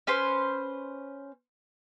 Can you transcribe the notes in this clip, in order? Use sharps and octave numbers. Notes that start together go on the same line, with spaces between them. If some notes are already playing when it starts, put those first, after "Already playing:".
C#4 B4 C5 C6